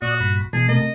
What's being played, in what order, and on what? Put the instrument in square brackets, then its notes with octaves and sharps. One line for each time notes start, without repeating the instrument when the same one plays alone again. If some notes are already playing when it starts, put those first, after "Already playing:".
[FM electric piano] A#2 [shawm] F#4 [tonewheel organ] D5 C#6 D#6
[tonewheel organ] G2 B5
[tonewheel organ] B2 A5 [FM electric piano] E3 G#3 [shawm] G#4
[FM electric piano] C3 A3 A#4 [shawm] D#5